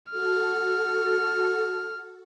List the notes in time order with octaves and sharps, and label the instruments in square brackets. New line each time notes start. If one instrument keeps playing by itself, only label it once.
[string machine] F#4 A4 [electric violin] F6